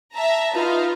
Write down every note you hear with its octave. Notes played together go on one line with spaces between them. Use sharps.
E5 A5 A#5
D#4 F4 B4 F5 A#5